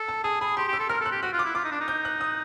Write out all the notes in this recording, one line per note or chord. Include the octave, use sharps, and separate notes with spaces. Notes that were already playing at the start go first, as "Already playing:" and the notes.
Already playing: A4
A5
G#4 A5
G#4 B5
G4 C6
G4 E6
A4
A#4 F6
A4 F#6
G4
F#4 F#6
F4
D6
E4
F4 D6
D#4
D4
D#4
G6
F#6
D#6